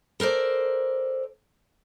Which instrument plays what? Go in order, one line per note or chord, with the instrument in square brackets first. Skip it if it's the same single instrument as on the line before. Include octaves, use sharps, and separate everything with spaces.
[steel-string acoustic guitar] A4 A#4 C5 D5